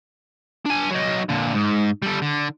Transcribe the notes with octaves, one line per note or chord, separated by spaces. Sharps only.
D4 G#5
F#3 D#4
A#2 D3
G#2
G3 A4
D3